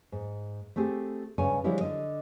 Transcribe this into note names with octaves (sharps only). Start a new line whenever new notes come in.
G#2
A3 C4 G4 G#4
G2 C#3 C#5 G#5
D3 F3 G3 G#3 E4 C#5
D3 D#5